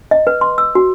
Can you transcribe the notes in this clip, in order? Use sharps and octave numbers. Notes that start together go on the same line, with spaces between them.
D#5
B4
C6
E6
F#4